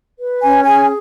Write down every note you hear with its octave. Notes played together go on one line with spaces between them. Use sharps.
B4
C#4 G#5
G#4 G#5